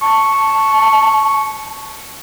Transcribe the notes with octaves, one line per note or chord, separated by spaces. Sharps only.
A5 C#6